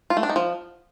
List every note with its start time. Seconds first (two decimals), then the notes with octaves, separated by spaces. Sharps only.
0.10 F4
0.17 A3
0.23 D4
0.29 D#4
0.36 F3